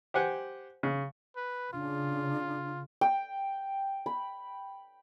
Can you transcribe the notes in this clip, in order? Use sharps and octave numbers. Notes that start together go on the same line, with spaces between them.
G4 C5 F#5 G#5
C#3
B4
C#3 D4 F4
G5
B5